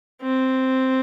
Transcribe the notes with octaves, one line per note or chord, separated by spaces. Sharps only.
C4